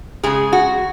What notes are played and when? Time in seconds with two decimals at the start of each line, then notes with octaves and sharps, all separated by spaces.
0.23 C#3 G#3 G#4
0.53 F#4